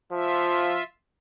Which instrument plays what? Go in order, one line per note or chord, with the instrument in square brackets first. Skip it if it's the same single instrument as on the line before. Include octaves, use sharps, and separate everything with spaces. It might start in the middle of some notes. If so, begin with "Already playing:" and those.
[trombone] F3 [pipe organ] F4 E5